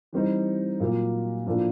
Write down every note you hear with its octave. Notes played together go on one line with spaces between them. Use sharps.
E3 G3 C4 D#4
A#2 F#3 A#3
A2 F3 A#3 D4